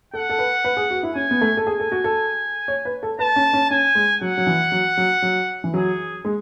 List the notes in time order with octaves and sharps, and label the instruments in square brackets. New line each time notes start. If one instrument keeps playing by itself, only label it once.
[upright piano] A4 [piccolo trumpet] F#5
[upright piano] A4
B4
B4
G#4
F#4
E4
[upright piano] C#4 [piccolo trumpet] G#5
[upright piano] B3
A3
A4
[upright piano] G#4 [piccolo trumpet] G#5
[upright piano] A4
F#4
A4
C#5
B4
A4
[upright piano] B4 [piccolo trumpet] A5
[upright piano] C#4
C#4
[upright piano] C#4 [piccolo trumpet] G#5
[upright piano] G#3
[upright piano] F#3 [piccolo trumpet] F#5
[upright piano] F#3
E3
F#3
F#3
F#3
E3
[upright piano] F#3 [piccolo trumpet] G#4
[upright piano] G#3